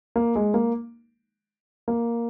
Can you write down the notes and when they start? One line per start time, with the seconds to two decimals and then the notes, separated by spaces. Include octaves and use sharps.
0.16 A#3
0.35 G#3
0.54 A#3
1.88 A#3